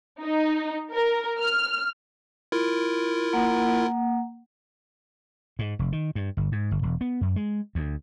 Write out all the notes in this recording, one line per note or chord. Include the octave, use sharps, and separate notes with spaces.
D#4
A#4
F6
E4 F4 A#4
A#3 F#5
G#2
F1
D#3
G2
G1
G#2
G1
E1
B3
F#2
G#3
D2